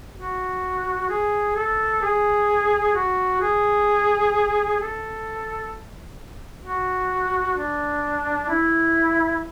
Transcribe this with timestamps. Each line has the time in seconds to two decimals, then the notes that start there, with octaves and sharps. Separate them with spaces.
0.17 F#4
1.09 G#4
1.56 A4
2.02 G#4
2.95 F#4
3.41 G#4
4.80 A4
6.64 F#4
7.57 D4
8.49 E4